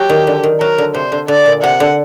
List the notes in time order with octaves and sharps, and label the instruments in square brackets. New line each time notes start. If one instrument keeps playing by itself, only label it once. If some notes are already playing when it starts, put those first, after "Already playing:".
Already playing: [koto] F#3 [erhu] G4
[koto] D#3
D3
D#3
[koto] F#3 [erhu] A#4
[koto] D3
[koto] C3 [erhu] C5
[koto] D3
[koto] D3 [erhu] D5
[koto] A#2
[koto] C3 [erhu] F#5
[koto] D3